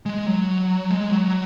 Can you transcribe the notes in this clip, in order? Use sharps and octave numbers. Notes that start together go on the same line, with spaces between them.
G#3
F#3
G#3
F#3